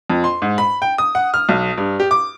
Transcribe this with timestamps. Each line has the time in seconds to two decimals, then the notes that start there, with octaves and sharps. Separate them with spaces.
0.10 F2
0.24 C6
0.42 G#2
0.58 B5
0.82 G5
0.98 D#6
1.15 F#5
1.34 F6
1.49 B1
1.78 G2
2.00 G4
2.11 D6